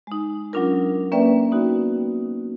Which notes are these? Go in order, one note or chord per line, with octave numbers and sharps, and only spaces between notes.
G#3 D#4
F#3 C#4 D4 F4 A#4
A#3 C#4 B4 D5 E5 G5
B3 D#4 F#4